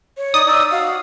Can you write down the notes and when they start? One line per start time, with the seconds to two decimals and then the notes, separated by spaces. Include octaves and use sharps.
0.17 C#5
0.34 D#4 D5 D#6
0.47 D#4 D5 E6
0.71 F#4 F5